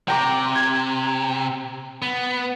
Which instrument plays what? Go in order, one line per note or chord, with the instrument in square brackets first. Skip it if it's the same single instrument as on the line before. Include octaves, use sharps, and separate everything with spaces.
[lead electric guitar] C3 [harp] G5 A#5 D6
[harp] G#6
[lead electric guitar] B3